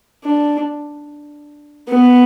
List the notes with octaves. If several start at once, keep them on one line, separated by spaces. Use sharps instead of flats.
D4
B3